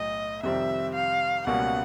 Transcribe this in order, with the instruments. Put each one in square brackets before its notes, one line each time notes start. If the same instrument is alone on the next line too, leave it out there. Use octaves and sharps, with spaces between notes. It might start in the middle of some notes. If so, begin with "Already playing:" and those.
Already playing: [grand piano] B1 A2 [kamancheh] D#5
[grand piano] F2 C3 D#3 G3 C4 [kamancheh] E5
[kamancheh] F5
[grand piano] C#2 B2 G3 A#3 C#4 [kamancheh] F#5